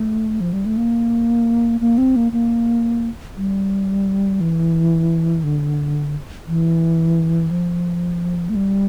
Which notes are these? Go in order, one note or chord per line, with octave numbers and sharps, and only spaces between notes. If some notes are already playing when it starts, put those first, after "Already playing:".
Already playing: A3
F3
G3
A3
A#3
A#3
C4
A#3
A#3
G3
E3
D3
E3
F3
A3
G3